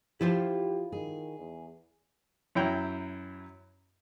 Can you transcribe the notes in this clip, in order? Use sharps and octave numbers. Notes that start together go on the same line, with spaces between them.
F3 E4 F4 G4 C5
D#3 G#4
E2
F#2 C#4 E4 G5 A#5